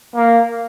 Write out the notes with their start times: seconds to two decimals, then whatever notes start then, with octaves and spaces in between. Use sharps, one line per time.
0.16 A#3